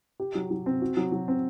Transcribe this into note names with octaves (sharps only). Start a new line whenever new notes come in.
G4
F#3
F#3
C4
F#4
F#3
F#3
C4